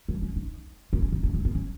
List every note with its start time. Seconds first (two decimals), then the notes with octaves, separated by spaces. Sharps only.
0.09 F#3
0.22 C#4
0.36 D#4
0.93 B3
1.02 C#4
1.12 D#4
1.23 C#4
1.34 G#3
1.45 B3
1.55 C#4